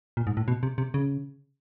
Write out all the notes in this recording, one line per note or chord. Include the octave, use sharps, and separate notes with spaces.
A#2
G#2
A2
B2
C3
C3
C#3